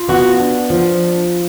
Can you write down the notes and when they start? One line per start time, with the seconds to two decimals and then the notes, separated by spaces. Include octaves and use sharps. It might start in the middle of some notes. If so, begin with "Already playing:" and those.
Already playing: F4
0.09 B3 F#4
0.40 D4
0.70 F3